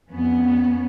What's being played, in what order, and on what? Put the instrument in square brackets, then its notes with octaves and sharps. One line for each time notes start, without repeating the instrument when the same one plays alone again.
[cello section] F2 B3 C#4